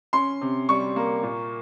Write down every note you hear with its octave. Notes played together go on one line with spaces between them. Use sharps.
C#4 C6
C3
G3 C#6
A#3
A#2